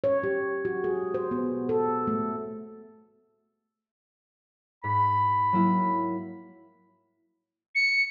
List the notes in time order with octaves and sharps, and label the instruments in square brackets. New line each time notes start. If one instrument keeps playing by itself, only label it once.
[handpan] C#5
G4
F#4
G#4
C5
B3
A4
A3
[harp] G#2 [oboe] B5
[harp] F#3 A#3 E4
[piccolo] C#7